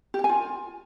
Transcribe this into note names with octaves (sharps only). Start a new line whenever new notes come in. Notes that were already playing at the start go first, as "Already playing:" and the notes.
G4
G5
G#5
F4